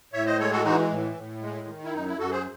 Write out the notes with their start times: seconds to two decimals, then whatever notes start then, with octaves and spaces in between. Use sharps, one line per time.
0.13 A2 C#5 E5
0.26 C5 D#5
0.39 G#3 A4 C#5
0.51 F#4 A4
0.64 E3 D#4 F#4
0.91 A2
1.16 A2
1.41 G#3
1.67 D#3
1.85 E4
1.93 F#2 D#4
2.06 E4
2.18 F#2 F#4 A4
2.31 G#4 C5